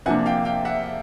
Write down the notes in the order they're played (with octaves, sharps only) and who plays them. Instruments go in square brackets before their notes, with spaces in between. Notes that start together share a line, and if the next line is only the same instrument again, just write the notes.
[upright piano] C3 F3 A#3 D4 [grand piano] F#5 G#5
[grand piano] F5 G5
F5 G5
E5 F#5